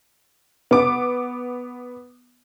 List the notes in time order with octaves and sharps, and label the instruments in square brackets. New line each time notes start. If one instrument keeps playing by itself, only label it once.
[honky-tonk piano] B3 D6